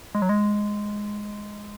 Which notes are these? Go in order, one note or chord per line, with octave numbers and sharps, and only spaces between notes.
G#3
F#3
G#3